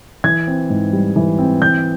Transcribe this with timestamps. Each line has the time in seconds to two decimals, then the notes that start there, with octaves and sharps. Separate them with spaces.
0.24 E3 G#6
0.47 C4
0.70 G#2
0.93 G3
1.16 E3
1.38 C4
1.61 E3 G6